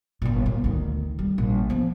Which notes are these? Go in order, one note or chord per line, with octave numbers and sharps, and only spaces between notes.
G1 A#2
A#2
D2 D#3
G3
A#1
F3 B3